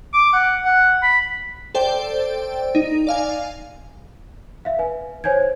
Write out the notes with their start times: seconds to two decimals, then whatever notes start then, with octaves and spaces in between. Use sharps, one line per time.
0.14 D6
0.33 F#5
0.65 F#5
1.03 B5
1.75 A4 C5 D5 G5
2.75 D#4
3.07 D5 F5 G#5
4.65 E5 F5
4.79 B4 G#5
5.24 C5 C#5 G#5 G6 G#6